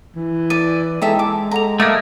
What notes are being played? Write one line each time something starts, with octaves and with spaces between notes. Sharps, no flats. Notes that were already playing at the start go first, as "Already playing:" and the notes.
E3
D5 D#7
G#3 D#4 A4 E5 G5
A5 D6
A4 F#5 A#5 F7
A3 A#3 D#5 D6